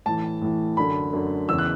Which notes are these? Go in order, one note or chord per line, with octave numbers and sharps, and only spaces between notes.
A2 E3 A5
A2 E3
F#2 D3 B5
F#2 D3
E2 C#3 E3 E6
F#6